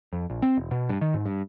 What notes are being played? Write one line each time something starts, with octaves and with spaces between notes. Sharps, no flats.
F2
A#1
C4
E1
B2
G2
D#3
G#2
G2